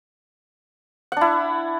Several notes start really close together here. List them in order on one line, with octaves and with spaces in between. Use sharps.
F#5 D4 E4